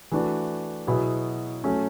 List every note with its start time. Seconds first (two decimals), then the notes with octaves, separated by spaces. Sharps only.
0.12 E3 A3 D4 F#4
0.87 B2 F#3 B3 E4 G#4
1.64 F#3 A3 C#4